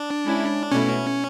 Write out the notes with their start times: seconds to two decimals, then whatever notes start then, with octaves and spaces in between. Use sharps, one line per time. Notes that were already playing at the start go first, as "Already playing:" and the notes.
Already playing: D4
0.24 G#3 C#4 E4
0.72 B2 A3 C#4 E4